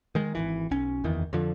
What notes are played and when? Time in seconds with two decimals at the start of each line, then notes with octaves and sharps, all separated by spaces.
0.15 D#3 G#3
0.35 G#1 C#2 E3
0.71 B1 C#4
1.04 F#1 E2 D#3 E3
1.33 F2 D3 F3